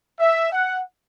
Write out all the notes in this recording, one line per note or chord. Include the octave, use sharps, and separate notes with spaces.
E5
F#5